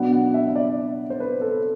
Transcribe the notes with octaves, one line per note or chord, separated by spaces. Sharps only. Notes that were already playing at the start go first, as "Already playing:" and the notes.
Already playing: B2 F#3 B3 D4 F#5
F#5
E5
E5
D5
C5
B4
A4